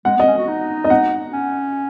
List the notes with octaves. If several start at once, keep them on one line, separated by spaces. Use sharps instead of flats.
G#3 F#5
B3 D#5
C#4
F#4
D#4
D#5
F#5
C#4